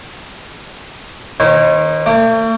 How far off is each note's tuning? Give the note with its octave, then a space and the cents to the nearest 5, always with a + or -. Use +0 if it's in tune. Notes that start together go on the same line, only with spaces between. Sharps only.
D#3 +0 C#4 -35 C5 -45
A3 +45 D6 +0